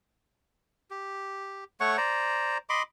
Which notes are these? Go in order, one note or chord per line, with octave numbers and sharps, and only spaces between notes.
G4
A3 C#5 F#5 C#6
C5 D5 A#5
D#5 B5 C6 D6